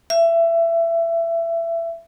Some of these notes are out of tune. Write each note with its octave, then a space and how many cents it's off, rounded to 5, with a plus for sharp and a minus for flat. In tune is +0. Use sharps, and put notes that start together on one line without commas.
E5 +25